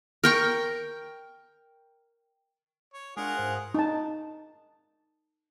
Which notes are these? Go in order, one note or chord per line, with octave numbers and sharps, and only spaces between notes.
A#4 G5 C#6
C#5
G#3 D4 F4 G#4 A#4 F#5
G#2 C5 F5
D#4 A5